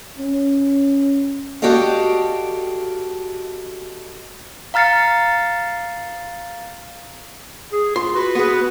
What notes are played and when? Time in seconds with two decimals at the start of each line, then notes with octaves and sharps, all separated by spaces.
0.18 C#4
1.62 F#4 G4 A4 D5 D#5 F5
4.74 F5 A#5 F6 A6 C7 C#7
7.72 G#4
7.96 F4 C6
8.15 F#4 B4
8.35 B3 G#4